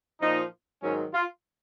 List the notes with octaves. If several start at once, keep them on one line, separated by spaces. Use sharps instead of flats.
A#2 F3 D#4
G#2 D#3 F#3 C#4
F4